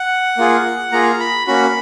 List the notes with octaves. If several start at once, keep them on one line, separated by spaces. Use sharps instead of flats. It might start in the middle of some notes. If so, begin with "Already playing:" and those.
Already playing: F#5
A#3 F4 G#4
A#3 F4 G#4 A#5
B5
A#3 C#4 F#4 B5